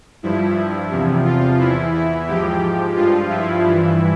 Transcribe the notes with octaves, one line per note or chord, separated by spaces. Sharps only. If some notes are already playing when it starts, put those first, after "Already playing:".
G2 F3 E4
E2 C3 F3
F4
E2 E3 E4
E4
G#2 F3 G4
G2 F3 F4
E4
G2 E3